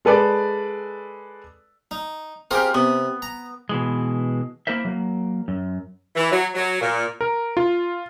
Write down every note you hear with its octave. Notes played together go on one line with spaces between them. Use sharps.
G#3 A4 B4 D5
D#4
C4 F4 G4 G#4 A#4 G5
C3 B3
A#5
B2 E3 G#3
A#3 E4 A#4 C5 E5
F#3 A#3
F#2
E3
F#3
F#3
A#2
A#4
F4